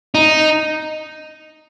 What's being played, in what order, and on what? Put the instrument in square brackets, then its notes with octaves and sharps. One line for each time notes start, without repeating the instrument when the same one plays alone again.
[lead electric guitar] D#4